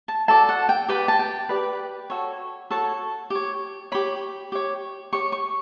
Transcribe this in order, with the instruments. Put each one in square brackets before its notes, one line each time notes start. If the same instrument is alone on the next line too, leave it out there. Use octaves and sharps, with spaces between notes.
[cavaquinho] A5
F#4 A4 D5 A5
F#5
G5
G4 B4 D5 G5
A5
G5
G4 B4 D5
F#4 A4 C#5
F#4 A4 C#5 A5
G4 C#5
G4 C#5 B5
G4 C#5
G4 C#5 C#6
C#6